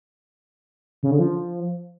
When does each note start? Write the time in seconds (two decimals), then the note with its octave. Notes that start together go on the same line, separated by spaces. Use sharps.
1.03 C#3
1.11 D3
1.19 F3